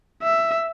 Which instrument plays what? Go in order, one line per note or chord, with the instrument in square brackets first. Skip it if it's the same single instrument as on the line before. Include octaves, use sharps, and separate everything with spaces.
[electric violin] E5